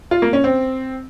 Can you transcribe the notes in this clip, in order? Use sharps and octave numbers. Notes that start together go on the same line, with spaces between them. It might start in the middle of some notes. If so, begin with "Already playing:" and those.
F4
A#3
C#4
C4